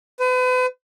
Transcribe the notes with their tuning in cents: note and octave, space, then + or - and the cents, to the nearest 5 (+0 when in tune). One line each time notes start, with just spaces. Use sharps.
B4 +40